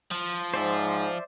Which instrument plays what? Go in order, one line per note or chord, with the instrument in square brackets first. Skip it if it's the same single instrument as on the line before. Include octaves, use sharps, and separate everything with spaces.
[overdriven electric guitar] F3
[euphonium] G#2 [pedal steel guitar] C5 D5 E5